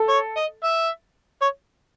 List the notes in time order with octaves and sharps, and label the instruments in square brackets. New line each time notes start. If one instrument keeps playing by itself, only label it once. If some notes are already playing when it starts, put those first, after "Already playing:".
Already playing: [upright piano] A4
[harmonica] C#5
D#5
E5
C#5